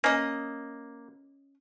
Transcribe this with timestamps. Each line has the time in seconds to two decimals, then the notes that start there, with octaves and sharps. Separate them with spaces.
0.04 A#3 C#4 D#5